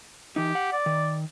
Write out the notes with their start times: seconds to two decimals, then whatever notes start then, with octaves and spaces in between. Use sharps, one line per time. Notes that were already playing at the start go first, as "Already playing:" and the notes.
0.36 E3 D#4 G4
0.55 F#5
0.72 D5
0.86 D#3